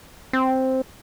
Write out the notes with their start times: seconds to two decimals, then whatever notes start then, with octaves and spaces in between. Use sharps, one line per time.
0.33 C4